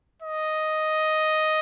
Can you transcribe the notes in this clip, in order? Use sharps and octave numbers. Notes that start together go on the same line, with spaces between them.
D#5